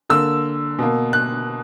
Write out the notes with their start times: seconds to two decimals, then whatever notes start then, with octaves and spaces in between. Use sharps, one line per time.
0.10 D3 A#3 E6
0.79 B2 A#3
1.13 F#6